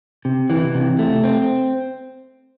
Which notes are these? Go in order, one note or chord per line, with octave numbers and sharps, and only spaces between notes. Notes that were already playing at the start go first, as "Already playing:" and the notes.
C3
E3
C3
A3
C4